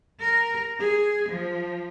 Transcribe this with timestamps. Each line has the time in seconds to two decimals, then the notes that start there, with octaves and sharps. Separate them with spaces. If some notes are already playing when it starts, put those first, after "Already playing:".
0.20 A#4
0.80 G#4
1.29 F3